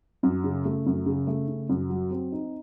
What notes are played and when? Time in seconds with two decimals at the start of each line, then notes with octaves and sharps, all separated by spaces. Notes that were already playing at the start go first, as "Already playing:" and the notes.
0.23 F#2
0.44 C#3
0.65 A3
0.86 F#2
1.06 C#3
1.27 A3
1.48 C#3
1.69 F#2
1.90 F#3
2.11 C4
2.32 D#4